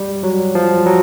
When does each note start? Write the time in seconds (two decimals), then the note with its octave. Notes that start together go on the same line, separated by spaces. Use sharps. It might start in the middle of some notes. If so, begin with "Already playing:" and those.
Already playing: G3
0.23 F#3
0.55 F3
0.86 F#3